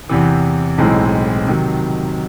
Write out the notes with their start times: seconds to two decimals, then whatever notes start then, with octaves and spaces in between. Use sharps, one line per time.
0.09 E2 C3 E3
0.78 B1 A2 E3 G#3 C4
1.47 C3 D#3 F#3